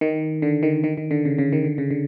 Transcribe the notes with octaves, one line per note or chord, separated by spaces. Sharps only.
D#3
D3
D#3
D#3
D#3
D3
C#3
C#3
D#3
D3
C#3
D3